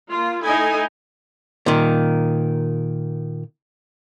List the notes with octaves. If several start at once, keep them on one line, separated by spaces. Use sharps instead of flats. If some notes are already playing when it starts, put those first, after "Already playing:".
A#3 F4
A3 D#4 E4 A4 D#5 G#5
A#2 D#3